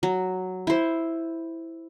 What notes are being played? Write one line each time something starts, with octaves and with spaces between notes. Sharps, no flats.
F#3
E4 C5